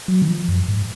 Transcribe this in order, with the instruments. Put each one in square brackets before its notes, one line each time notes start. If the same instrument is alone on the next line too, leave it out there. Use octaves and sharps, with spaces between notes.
[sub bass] F#3
D#3
F3
F#2
G#2